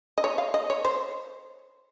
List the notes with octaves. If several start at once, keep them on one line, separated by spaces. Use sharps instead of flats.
D#5
C#5
F5
D#5
C#5
C5